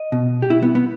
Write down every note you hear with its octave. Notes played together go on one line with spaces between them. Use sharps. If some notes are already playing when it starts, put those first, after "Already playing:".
Already playing: D#5
B2
G4
B2 E4
B3
B3